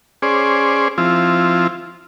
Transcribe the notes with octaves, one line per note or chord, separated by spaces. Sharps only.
C#4 G#4 C5 D5
F3 C4 E4 F4